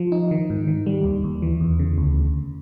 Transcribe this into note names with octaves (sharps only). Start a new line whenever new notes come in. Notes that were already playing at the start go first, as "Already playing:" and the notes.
Already playing: F3
D#4
D#3
G#2
D#3
G3
D#2
D#2
E3
E2
C#3
D2